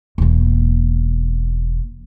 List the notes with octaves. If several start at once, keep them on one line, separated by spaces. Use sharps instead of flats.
E1 A#3